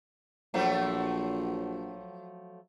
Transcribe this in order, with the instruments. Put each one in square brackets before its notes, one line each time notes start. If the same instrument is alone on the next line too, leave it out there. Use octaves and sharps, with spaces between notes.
[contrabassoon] A#1 [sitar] F3 F#3 A3